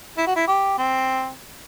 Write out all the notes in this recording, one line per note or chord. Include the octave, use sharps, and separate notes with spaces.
E4
F#4
E4
G4
C4